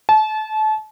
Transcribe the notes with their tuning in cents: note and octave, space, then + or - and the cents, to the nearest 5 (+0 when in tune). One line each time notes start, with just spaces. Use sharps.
A5 -30